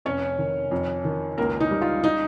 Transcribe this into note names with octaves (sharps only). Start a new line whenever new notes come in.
F1 C#4 C#5
D#3
F2
D#3
C#2 A#3 A#4
D#4
G3
F4
D#4